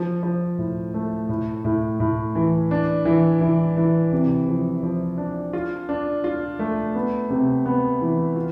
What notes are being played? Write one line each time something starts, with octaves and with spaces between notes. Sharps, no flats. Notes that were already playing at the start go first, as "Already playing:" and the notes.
Already playing: F3
F3
A2
A3
A2
A2
A2
E3
D4
E3
E3
E3
C3
F3
F3
D4
F4
D4
F4
A3
B3
C3
B3
E3
F4